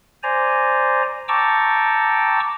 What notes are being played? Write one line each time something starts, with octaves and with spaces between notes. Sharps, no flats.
C5 D5 G#5 A#5
G5 A5 A#5 C#6 D6 E6